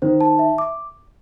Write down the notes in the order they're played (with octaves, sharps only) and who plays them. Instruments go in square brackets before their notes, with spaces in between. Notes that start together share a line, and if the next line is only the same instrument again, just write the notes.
[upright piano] D#3 [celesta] C5
[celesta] A5
E5
D6